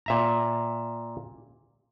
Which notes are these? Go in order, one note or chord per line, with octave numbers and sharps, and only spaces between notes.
A#2 E5 A#5